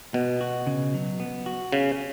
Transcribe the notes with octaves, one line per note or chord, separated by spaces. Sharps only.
B2 B3
F#4
C#3
F#3
B3
F#4
C#3 C#4